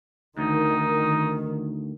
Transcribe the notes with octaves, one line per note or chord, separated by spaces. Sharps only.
D2 D#3 D#4